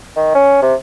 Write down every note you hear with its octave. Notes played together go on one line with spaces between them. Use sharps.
D#3
C#4
C3